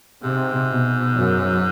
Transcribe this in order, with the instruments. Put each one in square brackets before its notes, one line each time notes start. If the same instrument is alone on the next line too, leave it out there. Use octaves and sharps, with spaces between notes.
[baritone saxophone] G#2 [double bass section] C3
[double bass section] B2
F#2